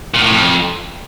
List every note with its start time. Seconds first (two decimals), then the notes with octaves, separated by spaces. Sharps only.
0.14 A#2
0.23 A2
0.31 F2